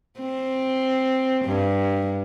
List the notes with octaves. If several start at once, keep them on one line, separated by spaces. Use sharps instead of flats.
C4
G2